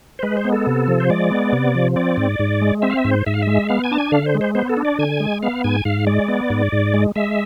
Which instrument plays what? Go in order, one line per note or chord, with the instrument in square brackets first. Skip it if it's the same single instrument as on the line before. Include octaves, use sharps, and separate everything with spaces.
[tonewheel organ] C5
G#3 B4
C5
B3
A4
C3
F3
C5
G#3 D5
B3
C3
F3
C4 D5
G#2
G#2
G#3
C4 E5
F5
E5
G#2
C5
G#2 E5
F5
G#3 E5
B3 F5
G#5
D4 A5
G#5
D3 F5
C5
G#3
C5
B3 C5
A4
D4
D5
D3 G#5
G#3
B3 F5
G#2 G#5
G#2 F5
G#3 D5
B3
G#2
G#2
G#3
G#3 E5